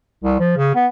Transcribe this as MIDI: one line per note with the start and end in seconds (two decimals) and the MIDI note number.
0.24 0.36 36
0.39 0.56 53
0.57 0.71 49
0.75 0.87 59